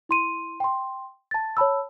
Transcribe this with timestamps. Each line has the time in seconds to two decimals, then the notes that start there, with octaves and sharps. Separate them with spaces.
0.09 E4 C6 D#7
0.60 G5 C6
1.31 A5 A6
1.57 C#5 A5 B5 E6